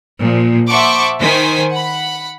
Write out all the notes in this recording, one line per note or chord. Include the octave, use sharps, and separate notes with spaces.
A#2 F3
C5 E5 F#5 A5 C#6 D6
D#3 C5 G#5 B6
F#5 B5